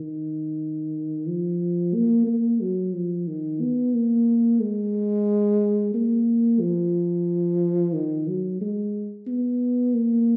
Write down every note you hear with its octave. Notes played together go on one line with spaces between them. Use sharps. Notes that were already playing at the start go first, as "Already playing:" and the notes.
Already playing: D#3
F3
A#3
A#3
F#3
F3
D#3
B3
A#3
G#3
A#3
F3
D#3
F#3
G#3
B3
A#3